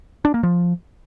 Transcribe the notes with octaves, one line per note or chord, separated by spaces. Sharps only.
D4
A#3
F3